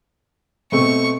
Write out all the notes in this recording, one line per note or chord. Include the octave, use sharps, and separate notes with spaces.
B2 A3 C4 C#6